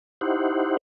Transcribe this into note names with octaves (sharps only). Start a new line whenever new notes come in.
D#4 E4 G4 C5 F#5